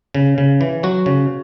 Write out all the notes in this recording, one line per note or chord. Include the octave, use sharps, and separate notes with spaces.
C#3
C#3
E3
F#3 F#4
C#3